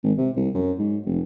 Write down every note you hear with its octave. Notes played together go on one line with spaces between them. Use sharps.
G#1
C3
C2
F#2
G#2
F1